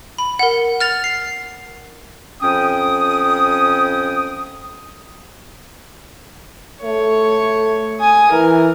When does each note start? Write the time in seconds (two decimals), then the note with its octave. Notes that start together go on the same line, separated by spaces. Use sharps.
0.18 B5
0.39 A#4 F#5
0.80 F6 A6 F7
1.04 C7
2.42 F2 C#4 G5 D#6
6.83 A3 C#5
8.00 G#5 D#6
8.31 E3 A#4